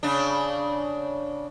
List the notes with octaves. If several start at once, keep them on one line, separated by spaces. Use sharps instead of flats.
C#3 D4